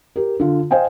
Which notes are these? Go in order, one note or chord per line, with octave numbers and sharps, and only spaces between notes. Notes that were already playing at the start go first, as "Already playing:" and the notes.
G4 A#4
D3 F4
C5 D#5 F5 G5 G#5